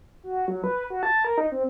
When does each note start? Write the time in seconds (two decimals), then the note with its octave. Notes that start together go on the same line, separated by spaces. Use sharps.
0.23 F#4
0.48 F#3
0.64 B4
0.90 F#4
1.03 A5
1.25 A#4
1.38 D#4
1.52 C4